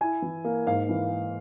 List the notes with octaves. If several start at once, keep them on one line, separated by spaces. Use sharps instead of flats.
E4 G#5
E3
A#3
G#2 F5
E3
A#3